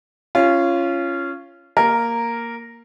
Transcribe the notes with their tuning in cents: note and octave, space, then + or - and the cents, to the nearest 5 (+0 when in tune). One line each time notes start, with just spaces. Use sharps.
C#4 +0 F4 -20
A#3 +0 A#4 -5